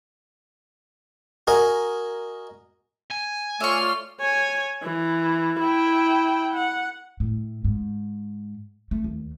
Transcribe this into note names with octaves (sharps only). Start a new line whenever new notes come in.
F#4 A#4 D#5 G#5
G#5
A3 F4 C#5 D5 E5 C6 C#6 F6
C#5 G#5
E3
E4 G5
F#5
A2
G#2
A3
D#2